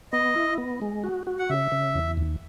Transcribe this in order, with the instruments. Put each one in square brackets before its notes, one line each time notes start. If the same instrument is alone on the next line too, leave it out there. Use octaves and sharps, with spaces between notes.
[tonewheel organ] B3 [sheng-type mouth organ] D#5
[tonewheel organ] E4
B3
G#3
F#4
F#4
[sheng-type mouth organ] F#5
[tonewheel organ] C#3 [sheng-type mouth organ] E5
[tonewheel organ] C#3
E2
D#2